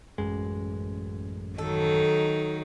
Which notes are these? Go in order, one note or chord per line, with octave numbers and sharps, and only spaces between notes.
A1 F#2 G#3
D#3 F#3 D#4 A4